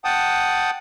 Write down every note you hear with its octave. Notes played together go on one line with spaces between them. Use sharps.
F#5 G5 A5 D#6